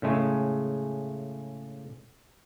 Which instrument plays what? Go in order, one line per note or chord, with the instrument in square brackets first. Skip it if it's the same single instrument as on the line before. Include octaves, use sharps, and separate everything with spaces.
[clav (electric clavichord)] A2 C#3 G#3 A3